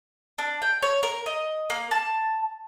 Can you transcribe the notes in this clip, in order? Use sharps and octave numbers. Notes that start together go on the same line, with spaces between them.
D4
G5
C#5
A#4
D#5
A#3
A5